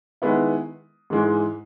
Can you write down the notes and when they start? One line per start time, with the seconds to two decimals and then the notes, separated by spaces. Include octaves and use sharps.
0.22 D#3 G#3 B3 E4
1.10 G#2 E3 G#3